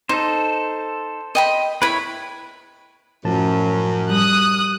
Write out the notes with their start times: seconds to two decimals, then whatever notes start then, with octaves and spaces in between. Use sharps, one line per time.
0.09 D#4 A4 C5
1.35 D#5 G5 B5
1.82 E4 B4 C#5 B5
3.25 F#2 A2 F3 A5
4.09 G3 D#6 F#6